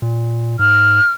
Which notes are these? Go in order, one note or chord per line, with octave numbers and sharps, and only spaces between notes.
A#2
G#2 F6